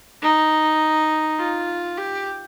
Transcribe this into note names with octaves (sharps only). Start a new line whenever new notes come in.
D#4
F4
G4